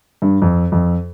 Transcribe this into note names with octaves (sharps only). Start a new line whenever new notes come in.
G2
F2
F2